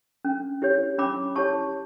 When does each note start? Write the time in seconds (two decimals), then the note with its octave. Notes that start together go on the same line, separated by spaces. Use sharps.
0.25 C#4
0.62 E4 G4 C#5
0.98 C#4 B5 D6
1.36 E4 G4 C#5 A5 C#6